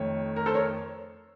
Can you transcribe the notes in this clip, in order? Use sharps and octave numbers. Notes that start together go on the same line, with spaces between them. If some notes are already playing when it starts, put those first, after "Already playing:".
Already playing: F2 D#3 A3 C#5
A#4
A4 C5
A#4 C#5